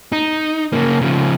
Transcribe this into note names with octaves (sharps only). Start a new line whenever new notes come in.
D#4
C#3 A#3
C#3 F3